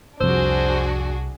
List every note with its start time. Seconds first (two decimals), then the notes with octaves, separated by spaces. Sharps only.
0.21 C2 F2 D4 F#4 G#4 C5 E6